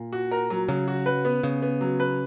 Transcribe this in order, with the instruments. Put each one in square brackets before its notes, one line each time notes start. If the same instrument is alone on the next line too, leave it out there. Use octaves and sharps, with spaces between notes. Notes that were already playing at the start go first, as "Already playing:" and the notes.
Already playing: [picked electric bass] A#2
[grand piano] F#4
A#4
F#3
[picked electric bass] C#3 [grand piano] F#3
[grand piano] F#4
B4
B3
[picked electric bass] C#3 [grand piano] B3
[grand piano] B3
F#3
B4